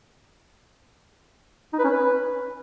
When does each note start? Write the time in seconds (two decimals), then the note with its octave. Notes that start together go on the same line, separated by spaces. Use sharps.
1.73 D#4
1.79 B4
1.84 C#4
1.90 B4